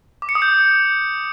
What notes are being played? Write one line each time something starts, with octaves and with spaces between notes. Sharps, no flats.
D6
C#7
D#6
G6